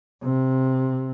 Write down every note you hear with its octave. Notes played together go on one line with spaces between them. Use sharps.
C3